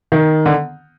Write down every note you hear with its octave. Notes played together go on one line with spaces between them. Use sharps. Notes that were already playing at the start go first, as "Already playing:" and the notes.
D#3
D3